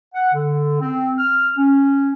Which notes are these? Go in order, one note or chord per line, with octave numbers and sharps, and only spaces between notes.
F#5
D3
C4
F6
C#4